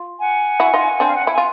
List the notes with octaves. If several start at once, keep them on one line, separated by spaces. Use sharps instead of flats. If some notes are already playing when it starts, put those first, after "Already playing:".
Already playing: F4
F#5 G#5
E4 F#4
D#4 F4
C4 D4
F5
F#5
E4 G5
G#5
F4